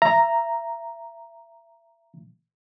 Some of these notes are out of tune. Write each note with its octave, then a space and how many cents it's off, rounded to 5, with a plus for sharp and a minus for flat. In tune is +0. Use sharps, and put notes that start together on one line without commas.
E5 +30 A#5 +0